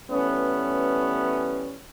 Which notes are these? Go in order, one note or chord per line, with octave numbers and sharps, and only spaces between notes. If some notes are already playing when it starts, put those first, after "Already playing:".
E3 G3 A3 B3 C#4